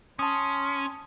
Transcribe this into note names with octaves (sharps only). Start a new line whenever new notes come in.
C#4 A5 C6 D#6